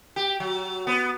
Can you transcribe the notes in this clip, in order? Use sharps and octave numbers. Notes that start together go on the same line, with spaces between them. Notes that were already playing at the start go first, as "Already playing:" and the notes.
G4
F#3
B3